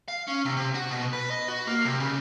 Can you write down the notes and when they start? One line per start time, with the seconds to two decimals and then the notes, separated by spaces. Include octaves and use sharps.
0.08 F5
0.28 C#4
0.45 C3
0.57 C3
0.75 F#4
0.91 B2
1.13 B4
1.31 D#5
1.48 F#4
1.67 A#3
1.85 C3
2.00 C#3